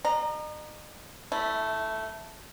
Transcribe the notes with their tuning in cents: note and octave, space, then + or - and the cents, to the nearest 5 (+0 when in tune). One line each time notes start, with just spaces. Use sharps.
D#5 -40 A#5 +0
A3 +0 E4 -20